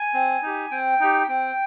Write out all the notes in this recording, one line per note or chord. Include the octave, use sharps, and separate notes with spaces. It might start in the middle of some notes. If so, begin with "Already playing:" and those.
Already playing: G#5
C4
D#4 G4
C4 G5
D#4 G4
C4 G5